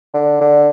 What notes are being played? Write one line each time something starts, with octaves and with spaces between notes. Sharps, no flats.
D3
D3